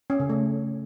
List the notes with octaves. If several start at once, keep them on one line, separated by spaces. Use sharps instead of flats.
C#4
C#3
A3